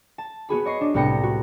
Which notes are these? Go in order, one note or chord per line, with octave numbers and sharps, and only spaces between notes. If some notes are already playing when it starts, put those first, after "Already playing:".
A5
B3 F#4 G#4 B5
C#5 D#5 C#6 C7
D4
C2 A2 B3 G5 A#6 C#7
F#4